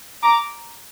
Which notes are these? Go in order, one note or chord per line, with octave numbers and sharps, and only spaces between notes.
A#5 D6